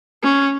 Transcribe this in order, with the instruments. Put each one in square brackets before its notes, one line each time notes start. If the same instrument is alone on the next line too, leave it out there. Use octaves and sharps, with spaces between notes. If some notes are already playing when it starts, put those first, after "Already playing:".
[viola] C#4